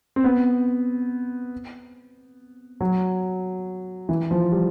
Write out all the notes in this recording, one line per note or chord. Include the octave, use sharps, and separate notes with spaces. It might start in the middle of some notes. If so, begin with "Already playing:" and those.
C4
B3
F#3
E3
F3
G3